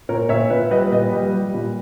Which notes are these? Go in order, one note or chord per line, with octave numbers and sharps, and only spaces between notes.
A#2 A#4 C#5
A#2 C#5 E5
A#2 B4
G3 B4 D#5
A#2 B4 D#5
G3
G3
A#2